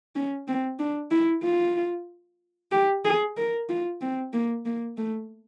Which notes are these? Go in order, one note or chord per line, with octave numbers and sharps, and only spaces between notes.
C#4
C4
D4
E4
F4
G4
G#4
A#4
F4
C4
A#3
A#3
A3